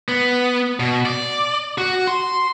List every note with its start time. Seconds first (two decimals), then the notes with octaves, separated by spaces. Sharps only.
0.09 B3
0.80 B2
1.06 D5
1.78 F#4
2.07 C6